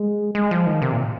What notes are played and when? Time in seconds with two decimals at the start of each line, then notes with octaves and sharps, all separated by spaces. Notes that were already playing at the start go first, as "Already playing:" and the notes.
Already playing: G#3
0.35 G#3
0.51 F3
0.66 D#3
0.82 C3
0.92 A#2